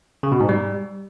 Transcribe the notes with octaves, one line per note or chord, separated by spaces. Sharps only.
C#3
B2
G#2
G3